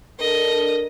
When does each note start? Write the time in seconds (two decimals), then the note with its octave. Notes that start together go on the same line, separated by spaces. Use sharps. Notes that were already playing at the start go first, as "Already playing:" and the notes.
0.19 D4 A4 A#4 D#5